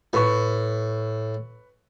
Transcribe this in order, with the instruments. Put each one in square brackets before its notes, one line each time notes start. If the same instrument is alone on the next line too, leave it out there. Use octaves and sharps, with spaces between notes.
[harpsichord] A2 [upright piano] B4 C#6